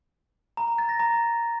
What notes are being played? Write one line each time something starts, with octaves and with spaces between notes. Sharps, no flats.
A#5
A#5
A6
A#6
A#5